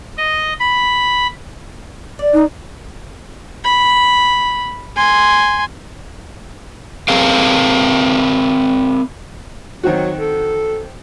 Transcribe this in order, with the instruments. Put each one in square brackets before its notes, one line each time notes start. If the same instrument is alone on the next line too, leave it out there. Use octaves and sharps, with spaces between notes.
[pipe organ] D#5
B5
[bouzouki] D5
[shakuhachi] D#4
[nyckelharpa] B5
G#5 C6
[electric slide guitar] C4 G#4 A#4 F5
[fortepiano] D#3 C4 F#4 [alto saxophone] F#3
[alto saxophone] A4